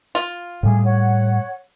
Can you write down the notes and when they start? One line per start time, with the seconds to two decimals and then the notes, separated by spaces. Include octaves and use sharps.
0.15 F4
0.63 A2 G3 G#4
0.84 C#5 F#5